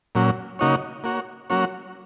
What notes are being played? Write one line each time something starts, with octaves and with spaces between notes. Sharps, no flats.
A#2 F#3 C#4
C#3 A#3 D#4 F#4 C#5
A#3 F#4 C#5
F#3 A#3 C#4 F#4 C#5